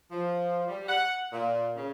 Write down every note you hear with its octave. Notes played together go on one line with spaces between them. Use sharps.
F3
G3
F#5
A#2
C#3